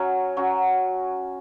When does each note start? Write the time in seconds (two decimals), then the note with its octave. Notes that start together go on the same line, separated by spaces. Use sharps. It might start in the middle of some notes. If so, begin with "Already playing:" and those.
Already playing: F#3 C#4 F#4
0.37 F#3 C#4 F#4